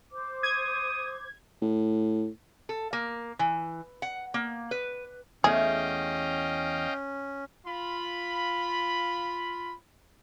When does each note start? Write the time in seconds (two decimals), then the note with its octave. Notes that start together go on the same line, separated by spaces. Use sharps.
0.11 C5 D6
0.43 D#6 G#6
1.62 A2
2.69 A4
2.93 A#3
3.39 E3
4.02 F#5
4.34 A#3
4.71 B4
5.44 E2 A3 C#4 G#4 D#5 F5 G5
7.66 F4 B5